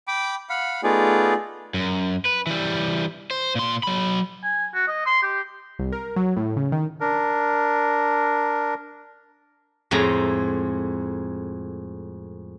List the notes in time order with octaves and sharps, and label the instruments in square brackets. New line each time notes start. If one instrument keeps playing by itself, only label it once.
[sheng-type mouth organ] G5 B5 D6
F5 F#5 B5
A3 B3 D#4 F4 G#4 D5
[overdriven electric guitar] F#2
B4
E3 G3
C5
A#2 C6
F#3 B5
[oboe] G#5
F#4
D#5
C6
G4
[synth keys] C2
A#4
F#3
A2
C#3
D#3
[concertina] D4 A#4
[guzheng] F2 A2 G#3 A#5